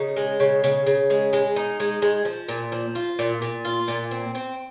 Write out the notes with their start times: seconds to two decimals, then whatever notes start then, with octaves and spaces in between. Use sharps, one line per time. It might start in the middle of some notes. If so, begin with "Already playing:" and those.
Already playing: C#3 D#4
0.16 G#3
0.40 C#3
0.64 C#3
0.86 C#3
1.10 G#3
1.33 G#3
1.56 D#4
1.80 G#3
2.02 G#3
2.25 F3
2.48 A#2
2.72 F3
2.95 F4
3.19 A#2
3.42 A#2
3.65 F4
3.88 A#2
4.11 C4
4.35 C4